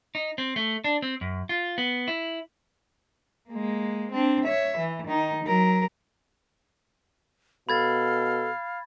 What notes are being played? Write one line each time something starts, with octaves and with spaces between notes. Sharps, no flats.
D#4
C4
A3
D4
C4
F#2
F4
B3
E4
G#3 A#3
C4 D4
C#5 E5
E3
D#3 D#4
F#3 A#4
B2 A4 F5 B5 G#6 A6